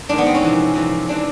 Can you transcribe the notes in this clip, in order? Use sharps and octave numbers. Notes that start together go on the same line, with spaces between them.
G#2 D#3 D4
B3
C4
C#4
F2 C3 E3
F2 C3 E3
C3 E3 D4